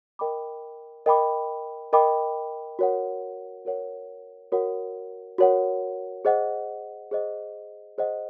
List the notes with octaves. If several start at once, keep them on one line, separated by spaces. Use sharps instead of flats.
A#4 D#5 G5 B5 D6
A#4 D#5 G5 B5 D6
A#4 D#5 G5 B5 D6
F#4 A#4 C#5 F#5
F#4 A#4 C#5 F#5
F#4 A#4 C#5 F#5
F#4 A#4 C#5 F#5
G#4 C5 D#5 F#5
G#4 C5 D#5 F#5
G#4 C5 D#5 F#5